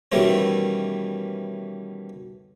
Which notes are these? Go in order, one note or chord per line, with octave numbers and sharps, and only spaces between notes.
B2 D#3 E3 G3 A3 C#4